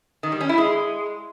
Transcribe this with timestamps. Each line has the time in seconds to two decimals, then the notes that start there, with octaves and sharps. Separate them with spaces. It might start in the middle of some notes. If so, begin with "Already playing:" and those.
0.23 D#3
0.32 G3
0.41 C#4
0.49 E4
0.58 G#3